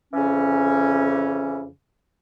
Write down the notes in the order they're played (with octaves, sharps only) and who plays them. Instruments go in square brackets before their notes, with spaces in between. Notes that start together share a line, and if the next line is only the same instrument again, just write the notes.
[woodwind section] F2 C#3 E3 C#4